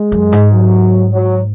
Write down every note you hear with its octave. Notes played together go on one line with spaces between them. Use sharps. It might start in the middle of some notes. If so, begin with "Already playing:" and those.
Already playing: G#3
F#2
G#2
F#3
F#3